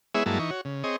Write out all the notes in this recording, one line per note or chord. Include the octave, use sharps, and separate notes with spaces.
G#3 B3 E4 G#4 C#5 E5
G2 F#3 G#3 A#3 E4 A5
E3 D#4 C#6
F#4 C#5
C#3
C4 G#4 C#5 D#5